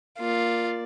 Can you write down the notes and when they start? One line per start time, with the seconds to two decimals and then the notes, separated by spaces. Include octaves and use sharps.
0.19 A#3 F4 D5